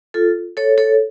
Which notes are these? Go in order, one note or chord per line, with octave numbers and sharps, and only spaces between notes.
F4 A4
A4 C#5
A4 C#5